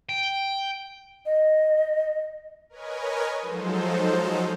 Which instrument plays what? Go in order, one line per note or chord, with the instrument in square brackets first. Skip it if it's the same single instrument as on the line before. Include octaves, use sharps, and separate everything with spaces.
[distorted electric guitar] G5
[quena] D#5
[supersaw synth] A#4 B4 C#5 D#5 G#5
F3 F#3 G#3 D#4 A4 C5